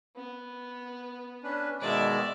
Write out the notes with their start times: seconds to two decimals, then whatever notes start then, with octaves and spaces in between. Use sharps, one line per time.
0.16 B3
1.43 C#4 D4 B4
1.81 B2 D#3 G#3 D5 E5